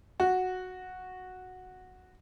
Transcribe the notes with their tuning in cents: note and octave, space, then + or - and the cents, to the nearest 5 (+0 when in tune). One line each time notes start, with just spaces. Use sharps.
F#4 -5